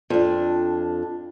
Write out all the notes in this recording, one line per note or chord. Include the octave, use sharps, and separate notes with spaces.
F2 D4